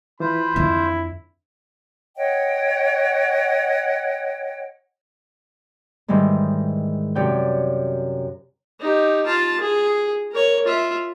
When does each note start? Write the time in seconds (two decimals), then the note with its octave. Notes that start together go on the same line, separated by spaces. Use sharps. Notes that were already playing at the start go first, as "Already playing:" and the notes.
0.20 E3 F4 C5 B5
0.56 F2 D3 E4
2.16 C#5 D#5 F#5 G5
6.08 G#2 D#3 E3 G3 G#3
7.15 F#2 C3 C#5 D5 G5 G6
8.80 D#4 G4
9.26 F4 A5
9.60 G#4
10.32 A#4 C#5
10.65 F4 E5